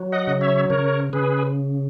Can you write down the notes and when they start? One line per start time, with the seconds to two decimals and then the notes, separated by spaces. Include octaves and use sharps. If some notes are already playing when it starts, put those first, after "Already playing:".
Already playing: F#3
0.12 D#5 F#5
0.27 C#3
0.41 C#5 E5
0.70 C#3 A#4 C#5
1.13 C#3 G#4 B4